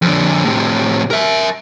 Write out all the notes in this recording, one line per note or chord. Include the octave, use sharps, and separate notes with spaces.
F2 D3
A2 C3
A#4 E5